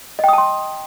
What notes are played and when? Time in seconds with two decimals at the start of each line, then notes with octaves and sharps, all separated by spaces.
0.19 D#5
0.24 G5
0.28 D#6
0.33 A5
0.38 C6